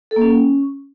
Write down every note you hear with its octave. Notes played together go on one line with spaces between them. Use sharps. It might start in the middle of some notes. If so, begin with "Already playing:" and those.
A4
A#3
C#4